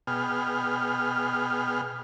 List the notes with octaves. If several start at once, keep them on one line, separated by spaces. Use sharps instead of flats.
B2 B3 G#4 G5 F6